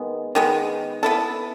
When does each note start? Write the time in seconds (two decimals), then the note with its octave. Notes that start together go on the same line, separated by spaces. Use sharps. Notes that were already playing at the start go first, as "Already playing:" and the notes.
Already playing: D#3 G#3 B3
0.35 D#3 G#3 B3
1.03 B3 E4 A4